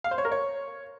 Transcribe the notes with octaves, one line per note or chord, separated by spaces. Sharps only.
F5
C5
C#5
A#4
C#5